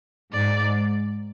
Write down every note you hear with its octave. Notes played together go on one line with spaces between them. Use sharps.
G#2 D5